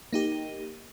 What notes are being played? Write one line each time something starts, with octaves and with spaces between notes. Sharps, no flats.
A#3 D#4 G4